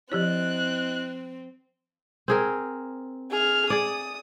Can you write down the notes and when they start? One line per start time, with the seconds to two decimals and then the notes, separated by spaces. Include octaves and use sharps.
0.12 F3 C4 E4 G4 C#5 D#5 F#6
2.28 C4 G#4 A#4
3.31 G#4 F6
3.70 G#4 D5 D#6